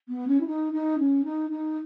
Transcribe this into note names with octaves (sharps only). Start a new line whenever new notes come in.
B3
C#4
E4
D#4
D#4
C#4
D#4
D#4